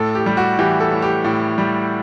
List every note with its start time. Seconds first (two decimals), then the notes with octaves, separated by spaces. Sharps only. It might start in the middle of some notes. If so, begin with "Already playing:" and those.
Already playing: A2 A4
0.15 G4
0.26 G3
0.37 F#4
0.59 E3 G4
0.80 A4
0.92 A2
1.02 G4
1.25 A2
1.58 G3